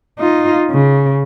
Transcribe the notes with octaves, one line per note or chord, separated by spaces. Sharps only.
D#4 F4
C#3